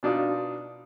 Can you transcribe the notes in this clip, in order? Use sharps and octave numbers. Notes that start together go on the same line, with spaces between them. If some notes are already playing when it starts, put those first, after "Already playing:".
B2 D4 D#4 F4